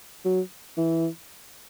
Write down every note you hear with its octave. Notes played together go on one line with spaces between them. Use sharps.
F#3
E3